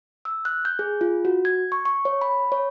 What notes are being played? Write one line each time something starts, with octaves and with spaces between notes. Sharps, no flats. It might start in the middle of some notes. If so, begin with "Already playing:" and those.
E6
F#6
G6
G#4
F4
F#4
G#6
C#6
C#6
C#5
B5
C#5